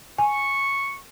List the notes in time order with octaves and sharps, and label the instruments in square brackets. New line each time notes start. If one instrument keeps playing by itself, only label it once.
[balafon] G#5 [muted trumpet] C#6